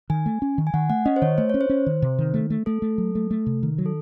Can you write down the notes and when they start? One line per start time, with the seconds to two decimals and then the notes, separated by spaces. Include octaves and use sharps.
0.10 D#3 G#5
0.26 A3
0.42 C#4
0.58 D#3
0.67 G#5
0.74 D#3 F#5
0.89 A3 F#5
1.05 C#4 D#5
1.16 C5
1.22 D#3 C#5
1.38 A3 C5
1.50 C#4 C#5
1.61 C5
1.69 C#4
1.86 D#3
2.02 C3
2.19 D#3
2.34 A3
2.50 A3
2.66 A3 A4
2.82 A3
2.98 F#3
3.15 A3
3.31 A3
3.46 C3
3.63 D#3
3.78 F#3
3.86 A4